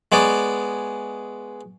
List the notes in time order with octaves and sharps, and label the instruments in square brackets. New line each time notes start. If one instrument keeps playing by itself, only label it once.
[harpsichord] G#3 B3 C#5 D5